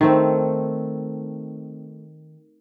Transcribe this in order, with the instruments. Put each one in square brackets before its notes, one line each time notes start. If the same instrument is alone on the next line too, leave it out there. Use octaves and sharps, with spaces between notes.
[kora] D#3 A3 C4